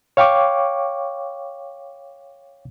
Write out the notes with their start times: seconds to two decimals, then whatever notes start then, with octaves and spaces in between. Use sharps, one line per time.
0.17 C#5 F5 G5 C#6 D6